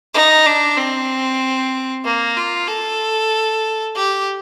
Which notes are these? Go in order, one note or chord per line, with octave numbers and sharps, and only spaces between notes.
D#4
D4
C4
A#3
F4
A4
G4